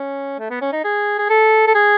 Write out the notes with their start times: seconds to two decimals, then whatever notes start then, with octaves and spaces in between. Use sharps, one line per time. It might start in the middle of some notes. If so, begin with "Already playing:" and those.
Already playing: C#4
0.39 A3
0.50 B3
0.61 C#4
0.72 D#4
0.84 G#4
1.18 G#4
1.29 A4
1.67 A4
1.75 G#4